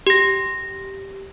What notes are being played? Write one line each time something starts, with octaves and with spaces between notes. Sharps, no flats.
G4 A#6